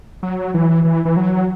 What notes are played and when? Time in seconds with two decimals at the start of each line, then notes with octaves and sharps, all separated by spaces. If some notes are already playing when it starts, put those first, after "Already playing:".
0.23 F#3
0.54 E3
0.85 E3
1.05 E3
1.17 F#3